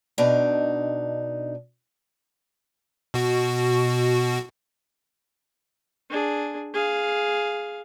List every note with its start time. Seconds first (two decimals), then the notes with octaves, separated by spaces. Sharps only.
0.18 B2 D4 D#4
3.14 B2 F#4
6.10 D4 G#4
6.74 G#4 F5